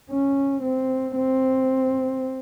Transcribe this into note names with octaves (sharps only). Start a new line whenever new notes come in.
C#4
C4
C4